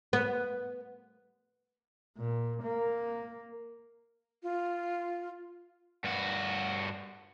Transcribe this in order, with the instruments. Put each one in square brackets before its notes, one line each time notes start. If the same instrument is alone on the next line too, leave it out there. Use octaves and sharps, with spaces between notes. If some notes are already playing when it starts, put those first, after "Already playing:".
[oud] B3
[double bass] A#2
A#3
[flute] F4
[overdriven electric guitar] G2 F#4